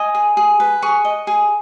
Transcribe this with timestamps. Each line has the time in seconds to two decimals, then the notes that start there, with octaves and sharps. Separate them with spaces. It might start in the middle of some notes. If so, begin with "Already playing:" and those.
Already playing: D#5 G#5
0.15 G#4
0.37 G#4
0.60 B4
0.82 G#4 C#6
1.05 D#5
1.27 G#4